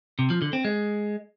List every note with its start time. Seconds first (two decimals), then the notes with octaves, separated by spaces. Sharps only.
0.19 C3
0.30 F3
0.42 D3
0.53 C4
0.65 G#3